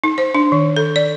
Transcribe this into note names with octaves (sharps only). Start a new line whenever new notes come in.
D#4
C5
D4
D#3
A4
D5